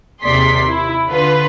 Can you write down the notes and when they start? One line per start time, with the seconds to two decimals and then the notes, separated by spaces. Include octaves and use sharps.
0.22 D#2 C3 G#4 D5 C6 B6
0.67 E4
1.08 D3 F4 B4